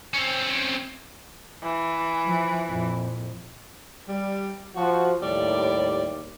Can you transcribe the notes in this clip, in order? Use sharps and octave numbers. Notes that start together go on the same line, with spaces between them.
C4 C#4
E3
F3
F2 A#2
G3
F3 F#4
D#2 A2 G3 D5